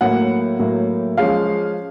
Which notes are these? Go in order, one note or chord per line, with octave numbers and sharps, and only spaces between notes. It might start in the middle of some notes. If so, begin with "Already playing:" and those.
A2 F#3 A#3 F#5
A2 F#3 A#3
F3 G#3 C#4 F5